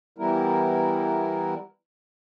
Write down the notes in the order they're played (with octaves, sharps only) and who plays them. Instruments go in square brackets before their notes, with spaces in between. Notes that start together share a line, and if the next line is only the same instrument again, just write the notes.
[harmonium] E3 G3 B3 E4 A#4